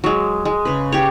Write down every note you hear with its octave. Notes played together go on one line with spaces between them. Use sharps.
F#3 G#3
G#3
C#3 B4
G4 C#5